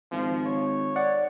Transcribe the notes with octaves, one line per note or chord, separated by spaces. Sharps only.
G#1 F3
C#5
D5 F#5